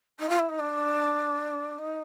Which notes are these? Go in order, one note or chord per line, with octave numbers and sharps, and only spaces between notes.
D#4
F4
E4
D#4
D4
D#4